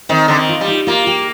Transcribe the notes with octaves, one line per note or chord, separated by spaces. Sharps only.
D#3 C4
D3 C4
D#3
F4
G3
D#4
A#3 F4
G4